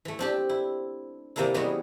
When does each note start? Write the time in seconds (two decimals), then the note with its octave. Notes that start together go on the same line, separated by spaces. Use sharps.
0.05 E3 A3
0.19 C4 D4 G4
0.49 E4
1.36 C3 E3 A#3 D4 E4
1.54 E3 G3 G#3 B3 C#4 F#4